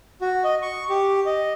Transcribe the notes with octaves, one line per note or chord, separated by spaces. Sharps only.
F#4
D#5
C#6
G4
D#5